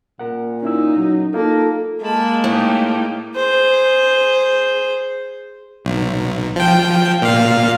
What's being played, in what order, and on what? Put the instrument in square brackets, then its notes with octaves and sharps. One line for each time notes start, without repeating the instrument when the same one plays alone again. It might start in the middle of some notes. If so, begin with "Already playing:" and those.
[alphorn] A#2 [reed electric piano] A#4 F#5
[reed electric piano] C#4 E4 E6 [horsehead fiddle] D#4
[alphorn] F#3
[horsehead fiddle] A#3 [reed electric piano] D#4 F4 [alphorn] A4
[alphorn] G#3 [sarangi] A#3 [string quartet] A5 B5
[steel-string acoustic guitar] A2 [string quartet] A3 D#4 G4
[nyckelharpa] G#4 C5
[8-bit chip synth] B1
F3 G5
A#2 F5